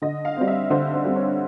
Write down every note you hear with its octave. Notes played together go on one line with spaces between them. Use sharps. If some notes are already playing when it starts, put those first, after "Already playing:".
D3 D#5
F5
G3 C4
E5
D3 C5
C5
G3 C4
C#5